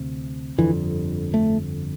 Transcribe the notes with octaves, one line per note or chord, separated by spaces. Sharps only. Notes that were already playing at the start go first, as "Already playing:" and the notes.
Already playing: D2 C3
G1 F2 D3 E3
A3